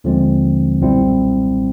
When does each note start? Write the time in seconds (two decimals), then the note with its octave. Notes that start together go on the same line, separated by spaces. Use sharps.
0.04 D#2 D3 F3 G#3 C4
0.81 B1 A#2 G3 C4 E4